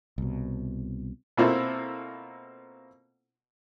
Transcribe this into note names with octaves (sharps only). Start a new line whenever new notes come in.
C2 B2
B2 A#3 C4 E4 F4 A4